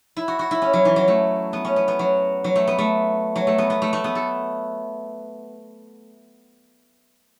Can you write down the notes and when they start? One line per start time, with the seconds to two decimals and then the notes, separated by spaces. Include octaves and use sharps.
0.16 E4
0.28 F#4
0.39 F#4
0.51 E4
0.62 C#4
0.73 F#3
0.85 E3
0.96 F#3
1.08 A3
1.53 B3
1.65 C#4
1.76 B3
1.88 B3
1.99 F#3
2.44 F#3
2.56 A3
2.67 B3
2.78 A3
3.36 F#3
3.47 A3
3.58 B3
3.70 B3
3.82 A3
3.93 A3
4.04 B3
4.15 A4